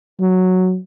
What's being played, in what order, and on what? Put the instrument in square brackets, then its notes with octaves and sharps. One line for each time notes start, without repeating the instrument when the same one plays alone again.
[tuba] F#3